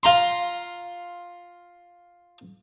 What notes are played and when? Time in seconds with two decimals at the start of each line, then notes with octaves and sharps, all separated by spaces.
0.03 F4 A#5 C6